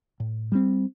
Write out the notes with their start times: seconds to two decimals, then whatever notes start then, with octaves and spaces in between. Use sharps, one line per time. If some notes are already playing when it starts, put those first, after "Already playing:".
0.20 A2
0.52 G3 C4